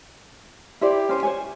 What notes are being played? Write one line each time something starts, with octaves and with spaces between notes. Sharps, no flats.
E4 G4 C5 D5
C#4 C5 C#5
C5 C#5 G#5